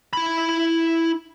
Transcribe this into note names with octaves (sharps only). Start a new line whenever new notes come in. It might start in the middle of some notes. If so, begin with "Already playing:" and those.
E4 B5